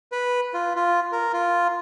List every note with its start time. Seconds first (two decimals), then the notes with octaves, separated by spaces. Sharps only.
0.12 B4
0.54 F4
0.76 F4
1.12 A#4
1.33 F4